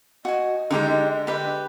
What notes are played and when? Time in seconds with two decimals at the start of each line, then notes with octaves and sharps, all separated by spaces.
0.25 F#4 D#5 G#5
0.71 D3 G#3 D#4 G4 D6
1.27 G4 B4 D6